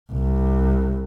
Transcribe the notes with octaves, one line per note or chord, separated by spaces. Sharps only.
C2